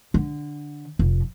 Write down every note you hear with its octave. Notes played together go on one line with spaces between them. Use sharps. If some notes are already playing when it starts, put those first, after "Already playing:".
D3
F1